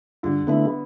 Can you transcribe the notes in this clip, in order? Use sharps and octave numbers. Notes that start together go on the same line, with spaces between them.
G2 D3
D3 A3 B3 E4